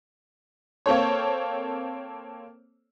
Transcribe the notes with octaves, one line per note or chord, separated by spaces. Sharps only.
A#3 C4 A4 C#5